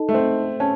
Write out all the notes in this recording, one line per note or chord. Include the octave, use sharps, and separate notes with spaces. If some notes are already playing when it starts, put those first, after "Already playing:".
Already playing: D#4 A4 D#5 A5
A3
C4
C#4 A5